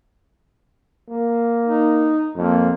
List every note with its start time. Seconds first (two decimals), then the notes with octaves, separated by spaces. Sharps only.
1.09 A#3
1.66 D#4
2.36 F2 A#3